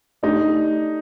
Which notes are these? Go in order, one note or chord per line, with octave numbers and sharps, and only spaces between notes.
A3 D4 D#4 G4 D5